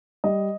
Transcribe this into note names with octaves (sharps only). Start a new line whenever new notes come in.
G3 D#5